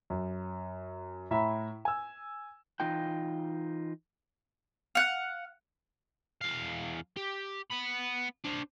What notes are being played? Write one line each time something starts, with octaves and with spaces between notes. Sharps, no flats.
F#2
A2 E5 A#5 B5
G#5 E6
E3 D#4 F4 G5
F5 F#5
E2 F5
G4
B3 B5
D4 C5